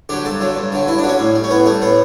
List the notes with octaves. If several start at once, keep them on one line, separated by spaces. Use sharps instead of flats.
D3 F#3 G4
G2 A4
D3 F#3
G2
D3 F#3
G2 E4
D4
D3 F#3
C#4
A2
G3
C#4
A2 B3
G3 A3
A2 B3